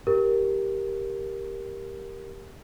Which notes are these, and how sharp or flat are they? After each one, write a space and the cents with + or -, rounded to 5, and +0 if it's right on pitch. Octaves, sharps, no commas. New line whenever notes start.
G4 +0 A#4 +0